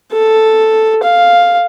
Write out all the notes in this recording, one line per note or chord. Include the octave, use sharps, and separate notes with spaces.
A4
F5